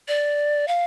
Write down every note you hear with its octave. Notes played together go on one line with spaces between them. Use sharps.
D5
F5